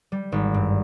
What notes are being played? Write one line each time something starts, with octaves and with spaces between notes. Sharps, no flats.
G3
G#1
G2